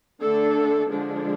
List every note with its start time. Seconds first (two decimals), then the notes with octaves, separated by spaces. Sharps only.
0.21 D3 A3 D4 A4
0.89 D3 F3 G#3 D4